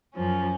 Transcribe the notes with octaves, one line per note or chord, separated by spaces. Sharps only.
F#2 F3 C#4